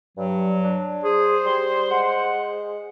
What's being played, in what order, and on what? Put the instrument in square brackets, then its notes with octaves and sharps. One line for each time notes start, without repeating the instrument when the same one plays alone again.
[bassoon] G2 [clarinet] F#3
[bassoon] D4
[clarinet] G#4 [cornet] C5
[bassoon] G3 [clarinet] C6
[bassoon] G#3 [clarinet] F#5